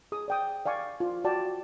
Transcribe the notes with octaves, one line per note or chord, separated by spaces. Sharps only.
G#4 D#6
D5 G5 D#6
D5 F5 G#5 C#6
F4
F#4 D5 G5 A5